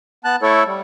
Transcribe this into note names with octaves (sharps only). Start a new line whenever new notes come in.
B3 A5 F#6
A3 E4 A4 C#5
G3